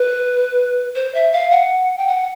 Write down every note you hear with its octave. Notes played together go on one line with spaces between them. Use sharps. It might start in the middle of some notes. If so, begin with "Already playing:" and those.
Already playing: B4
C5
E5
F5
F#5
G5
F#5